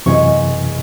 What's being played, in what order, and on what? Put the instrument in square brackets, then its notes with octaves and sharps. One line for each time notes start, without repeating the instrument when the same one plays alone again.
[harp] E1 G#3 C#6 [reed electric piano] F#2 C3 E3